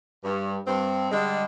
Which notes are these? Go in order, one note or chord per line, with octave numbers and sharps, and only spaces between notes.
G2
G2 C4
D3 G3 G#3